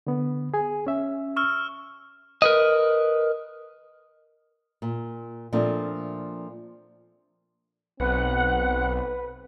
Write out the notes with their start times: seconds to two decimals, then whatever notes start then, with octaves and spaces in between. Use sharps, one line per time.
0.07 D3 B3
0.54 G#4 G#5
0.87 C#4 E5
1.36 C#6 E6 F6
2.42 A#4 B4 D#5
4.82 A#2
5.52 A#2 F3 A3 C4 D4
8.00 B1 C4 B4 F#5